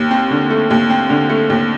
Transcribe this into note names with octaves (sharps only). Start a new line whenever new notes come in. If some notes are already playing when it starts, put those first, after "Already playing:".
Already playing: D#2
C4
D3
A3
D#2
C4
D3
A3
D#2